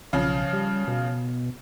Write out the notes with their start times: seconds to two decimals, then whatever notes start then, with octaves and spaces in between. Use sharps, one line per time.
0.13 B1 C#3 F3
0.53 G3
0.88 B2